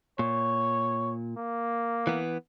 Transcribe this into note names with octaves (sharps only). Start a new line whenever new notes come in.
A#2 C#5
A#3
E3 B3